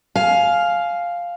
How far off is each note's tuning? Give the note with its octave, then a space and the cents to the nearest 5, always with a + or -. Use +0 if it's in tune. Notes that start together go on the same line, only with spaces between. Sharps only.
F5 +0 G#5 +25